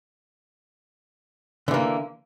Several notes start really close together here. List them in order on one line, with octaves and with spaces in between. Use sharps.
D3 E3 A#3